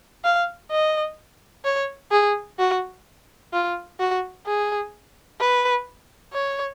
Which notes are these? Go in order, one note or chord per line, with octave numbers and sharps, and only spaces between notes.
F5
D#5
C#5
G#4
F#4
F4
F#4
G#4
B4
C#5